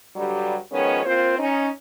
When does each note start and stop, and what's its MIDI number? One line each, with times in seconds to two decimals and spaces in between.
0.16 0.56 43
0.16 0.56 50
0.16 0.56 54
0.16 0.56 55
0.72 1.03 51
0.72 1.03 53
0.72 1.03 56
0.72 1.03 59
0.72 1.03 61
0.72 1.03 73
1.05 1.37 58
1.05 1.37 60
1.05 1.37 65
1.05 1.37 72
1.39 1.68 61
1.39 1.68 63